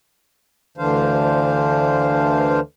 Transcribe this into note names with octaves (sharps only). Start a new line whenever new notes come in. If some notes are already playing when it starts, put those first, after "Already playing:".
D2 D3 E3 D4 C5 F5